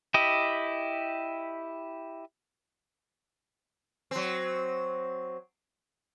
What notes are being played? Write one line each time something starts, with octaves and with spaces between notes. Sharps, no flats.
E4 G4 D#5
F#3 C4